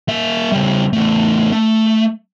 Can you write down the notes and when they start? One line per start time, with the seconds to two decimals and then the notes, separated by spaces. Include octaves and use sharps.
0.09 A#3 E5
0.52 C#3 G3
0.93 E2 A3
1.52 A3